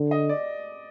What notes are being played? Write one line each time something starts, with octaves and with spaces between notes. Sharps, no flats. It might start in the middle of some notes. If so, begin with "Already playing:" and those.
Already playing: D3
D#5
D5